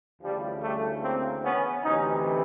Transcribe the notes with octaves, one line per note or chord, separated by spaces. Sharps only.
D2 C#3 E3 F3 G3
G3 A3
A#3 C4
B3 C#4
D2 C3 E3 C#4 D#4